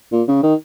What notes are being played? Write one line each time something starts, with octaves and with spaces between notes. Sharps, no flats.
A#2
C#3
D#3